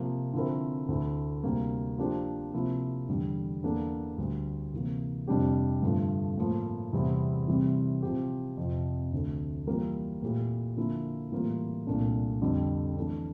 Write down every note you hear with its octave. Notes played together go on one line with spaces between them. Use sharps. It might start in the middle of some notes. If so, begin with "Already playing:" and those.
Already playing: C3 F3 A#3
D3 F3 C4 E4 A#4
D2 D3 A3 E4
D2 C3 G3 A#3
F3 A#3 D4 G4 C5
C3 F3 A#3 E4
E2 D3 G3
E2 E3 A#3 D4 A4
D2 D3 G3
C3 E3 A#3
F2 C3 G3 D4 G4
G2 D3 F3 A3
A2 F3 A#3
E2 C3 G3 C4 E4
C3 E3 G3 C4 E4
C3 F3 C4 G4
F2 C3 F3
D2 D3 A3
E3 G3 A#3 F4 A#4
A#2 A3 E4 G4
D3 F3 A#3 E4
A2 E3 G3 A#3 F4
C2 A#2 A3 D4
F2 D3 G3
E3 A3 D4